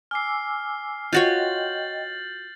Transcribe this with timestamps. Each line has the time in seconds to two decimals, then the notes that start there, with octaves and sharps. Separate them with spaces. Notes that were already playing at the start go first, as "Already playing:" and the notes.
0.11 G#5 D6 E6 F6 C7
1.13 F4 F#4 C#5 D#5 G5 G6 A6 F#7